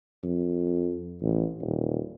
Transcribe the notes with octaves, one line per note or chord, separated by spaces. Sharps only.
F2
A1
D#1